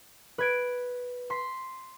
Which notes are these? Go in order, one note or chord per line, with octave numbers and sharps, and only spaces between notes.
B4 G#6 D7
C6 B6